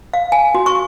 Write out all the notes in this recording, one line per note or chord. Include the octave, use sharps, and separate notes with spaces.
F5
G#5
F#4
C#6